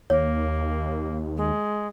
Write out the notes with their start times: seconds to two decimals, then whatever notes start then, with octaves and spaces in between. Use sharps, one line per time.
0.10 D#2 A#3 C#5
1.37 G#3